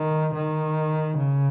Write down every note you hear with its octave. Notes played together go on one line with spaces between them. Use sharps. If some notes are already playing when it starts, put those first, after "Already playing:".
Already playing: D#3
D#3
C#3